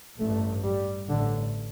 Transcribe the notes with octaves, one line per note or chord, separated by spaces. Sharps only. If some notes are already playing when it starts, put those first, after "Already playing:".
A1 G2 A3
G3
A1 A2 D3